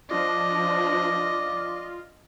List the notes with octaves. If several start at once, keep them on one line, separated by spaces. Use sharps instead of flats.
F3 D4 F4 D5 D#5